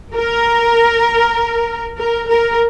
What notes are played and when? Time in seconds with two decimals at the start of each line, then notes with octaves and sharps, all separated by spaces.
0.15 A#4
1.97 A#4
2.28 A#4